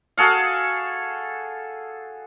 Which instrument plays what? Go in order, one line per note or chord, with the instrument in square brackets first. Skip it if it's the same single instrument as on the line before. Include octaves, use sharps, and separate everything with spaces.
[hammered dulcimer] F#4 G#4 A4 F5